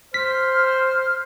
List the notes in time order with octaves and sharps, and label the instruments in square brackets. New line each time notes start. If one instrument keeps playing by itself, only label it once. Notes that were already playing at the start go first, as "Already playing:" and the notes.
[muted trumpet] C5 [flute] F6 [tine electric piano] B6